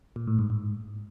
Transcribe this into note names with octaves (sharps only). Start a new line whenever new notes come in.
A#2
A2
G#2
G#2